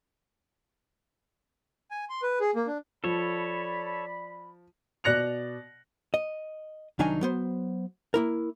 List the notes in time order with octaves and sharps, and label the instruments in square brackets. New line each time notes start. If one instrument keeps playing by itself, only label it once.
[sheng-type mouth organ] G#5
C6
B4
G#4
A#3
D4
[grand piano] F3 [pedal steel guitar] A4 C#5 [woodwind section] D5 B5
[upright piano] B2 D5 F#6 A#6 C#7 F7
[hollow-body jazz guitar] D#5
C2 D#3 F#3 D4 D#4 G#5
F#3 B3 C5
A#3 E4 A#4